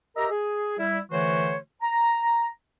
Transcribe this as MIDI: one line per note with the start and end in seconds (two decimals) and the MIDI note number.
0.16 0.28 67
0.16 0.28 70
0.16 0.28 75
0.16 0.28 76
0.16 0.28 82
0.31 0.76 68
0.78 0.98 55
0.78 0.98 64
1.12 1.57 50
1.12 1.57 52
1.12 1.57 57
1.12 1.57 66
1.12 1.57 72
1.12 1.57 73
1.82 2.49 82